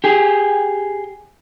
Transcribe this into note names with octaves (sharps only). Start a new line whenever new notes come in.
G4 G#4